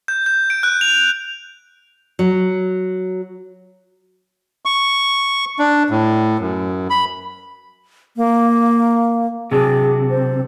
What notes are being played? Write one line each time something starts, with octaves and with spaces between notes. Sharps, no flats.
G6
G6
D7
F#6
F7
F#3
C#6
D4
A2
F#2
B5
A#3
C3 F#3 D4 G#4
C5